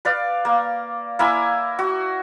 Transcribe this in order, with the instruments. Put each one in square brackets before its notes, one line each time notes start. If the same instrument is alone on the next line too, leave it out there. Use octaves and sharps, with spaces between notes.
[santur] B4 D5 F5
A#3
A#3 E4 E5 G#5
F#4